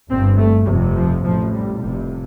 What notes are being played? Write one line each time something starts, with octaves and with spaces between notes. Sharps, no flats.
G1 G2 C4
A3
F1 F2 C3 G3
F3
A1 A2 F3
G3
F1 F2 C3 G3